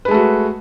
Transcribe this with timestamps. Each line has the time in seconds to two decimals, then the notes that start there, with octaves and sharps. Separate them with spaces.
0.05 B4
0.08 G#3
0.11 A3
0.14 F#4